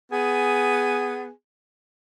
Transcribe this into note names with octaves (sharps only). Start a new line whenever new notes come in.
B3 G#4